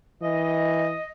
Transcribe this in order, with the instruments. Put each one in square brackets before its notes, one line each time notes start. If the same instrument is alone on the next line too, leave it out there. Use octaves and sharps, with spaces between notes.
[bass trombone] E3 [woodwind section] D#5